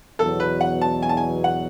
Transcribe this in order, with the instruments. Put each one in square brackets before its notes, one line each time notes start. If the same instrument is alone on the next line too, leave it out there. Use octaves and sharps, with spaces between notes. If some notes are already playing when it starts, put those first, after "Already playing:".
[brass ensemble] E2 B2 F#3 [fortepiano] A4
[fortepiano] B4
F#5
A5
G#5
A5
G#5
F#5